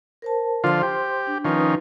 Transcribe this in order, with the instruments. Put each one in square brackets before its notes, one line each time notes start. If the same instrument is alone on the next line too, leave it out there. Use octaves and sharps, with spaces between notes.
[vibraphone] A#4 C5 A5
[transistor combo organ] D3 F3 F4 [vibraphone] C5 C6
[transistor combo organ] G4
[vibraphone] D4
[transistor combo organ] D#3 F3 C#4 [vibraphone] D#4 B4 D#6